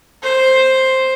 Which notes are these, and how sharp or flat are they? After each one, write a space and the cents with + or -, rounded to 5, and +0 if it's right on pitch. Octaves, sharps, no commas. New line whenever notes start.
C5 +5